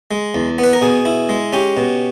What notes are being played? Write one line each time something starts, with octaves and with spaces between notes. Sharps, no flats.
G#3
E2
B3
B4
A#4
B2 G#4
E4
G#3
C#4 G4
B2